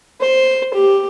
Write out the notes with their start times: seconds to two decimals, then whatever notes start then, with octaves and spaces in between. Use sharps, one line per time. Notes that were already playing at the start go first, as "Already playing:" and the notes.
0.21 C5
0.74 G4